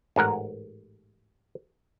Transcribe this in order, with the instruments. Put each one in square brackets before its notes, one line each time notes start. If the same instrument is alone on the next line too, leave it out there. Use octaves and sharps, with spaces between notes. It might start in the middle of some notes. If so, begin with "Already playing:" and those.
[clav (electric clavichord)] A1 G#2 A#4 F#5